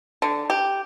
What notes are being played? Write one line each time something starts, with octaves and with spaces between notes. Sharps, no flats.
D3
G4